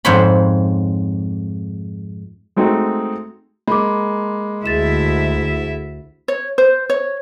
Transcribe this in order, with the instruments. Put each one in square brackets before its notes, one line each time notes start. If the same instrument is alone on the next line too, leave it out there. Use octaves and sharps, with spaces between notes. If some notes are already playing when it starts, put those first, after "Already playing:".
[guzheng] F2 G#2 G#3 C5 C#5 B5
[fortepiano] G#3 A3 C4 D#4 F#4 G#4
[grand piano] G#3 A#3 [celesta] B5 D6
[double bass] D2 [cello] E4 E5 [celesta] G#4 A6 E7
[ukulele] C#5
C5
C#5